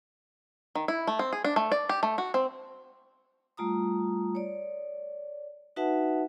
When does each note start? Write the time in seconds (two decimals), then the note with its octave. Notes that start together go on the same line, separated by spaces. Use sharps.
0.75 D#3
0.88 E4
1.07 A3
1.19 C4
1.33 G#4
1.45 D4
1.56 A3
1.72 D5
1.89 G4
2.03 A3
2.18 F#4
2.34 C4
3.57 G3 A3 F4 A#5 D#6
4.35 C#5 D5
5.76 D#4 F#4 B4 E5 F#5 A5